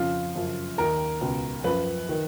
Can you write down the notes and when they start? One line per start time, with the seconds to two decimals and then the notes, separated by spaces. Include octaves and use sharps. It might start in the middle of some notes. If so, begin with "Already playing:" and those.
Already playing: F2 C#3 F3 F4
0.34 F#2 C#3 F3
0.78 D#2 D#3 A#4
1.21 C#2 B2
1.64 F#2 F3 B4
2.09 D#3